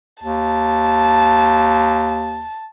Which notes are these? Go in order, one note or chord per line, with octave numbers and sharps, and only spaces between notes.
D#2 A5